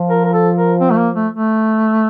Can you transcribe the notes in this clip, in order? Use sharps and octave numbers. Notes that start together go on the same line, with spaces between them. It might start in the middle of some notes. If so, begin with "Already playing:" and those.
Already playing: F3
A#4
A#4
A4
A#4
C4
A3
A#3
A3
A3